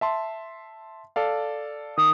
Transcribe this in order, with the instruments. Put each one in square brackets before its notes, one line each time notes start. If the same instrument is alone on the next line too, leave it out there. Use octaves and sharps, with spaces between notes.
[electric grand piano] E5 A5 C6
A4 D5 F5
[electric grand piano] D#3 [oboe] D#6